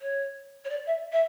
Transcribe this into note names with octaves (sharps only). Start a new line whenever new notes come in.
C#5
C#5
D5
E5
E5